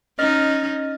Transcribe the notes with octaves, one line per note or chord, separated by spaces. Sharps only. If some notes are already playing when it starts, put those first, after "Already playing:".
C#4 D#4 D#5 F6 A6